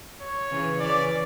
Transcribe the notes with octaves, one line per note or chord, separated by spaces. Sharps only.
C#5
C#3 E3
C#3 E3 D5